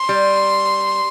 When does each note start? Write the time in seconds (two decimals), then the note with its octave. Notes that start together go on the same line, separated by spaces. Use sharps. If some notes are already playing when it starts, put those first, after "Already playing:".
Already playing: C6
0.09 G3